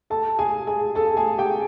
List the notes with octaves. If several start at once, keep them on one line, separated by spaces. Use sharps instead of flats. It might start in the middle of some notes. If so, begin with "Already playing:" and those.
A4 A5
G#4 G#5
G#4 G#5
A4 A5
G#4 G#5
G4 G5